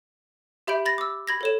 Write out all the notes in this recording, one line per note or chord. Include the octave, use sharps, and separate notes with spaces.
G4 E5 B5 G6 D7
B5 A6 A#6
D6 E6
B5 G#6 A#6
A4 C#5 E7